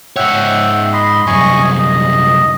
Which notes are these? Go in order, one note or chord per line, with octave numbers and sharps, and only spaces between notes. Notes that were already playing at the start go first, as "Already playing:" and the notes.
G#2 C#5 E5 F#5 G5
D#5 B5 C6
C2 F#2 D#5 G#5 C#6
D#5